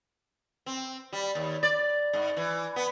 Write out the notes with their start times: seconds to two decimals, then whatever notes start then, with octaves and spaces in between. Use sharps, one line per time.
0.66 C4
1.13 G3
1.35 D#2
1.63 D5
2.13 G#2
2.37 E3
2.76 B3